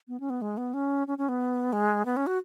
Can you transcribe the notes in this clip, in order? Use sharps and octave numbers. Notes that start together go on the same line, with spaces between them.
B3
C#4
B3
G#3
B3
C#4
C#4
C#4
B3
G#3
B3
C#4
F#4